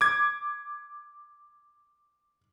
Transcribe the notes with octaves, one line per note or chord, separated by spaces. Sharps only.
D6 G#6